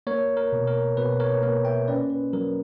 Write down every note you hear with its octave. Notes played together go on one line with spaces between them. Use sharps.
A#3 A#4 C#5
A#4
B2
A#4
B2 B4
A#4 C#5
A#3 A#4
E5 G5
C#4 B4 D5
B4
F#3 A#4